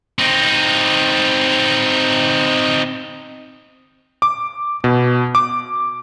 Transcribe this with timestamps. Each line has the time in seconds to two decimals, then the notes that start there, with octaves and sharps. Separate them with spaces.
0.19 C4 D#4
4.22 D6
4.84 B2
5.35 D6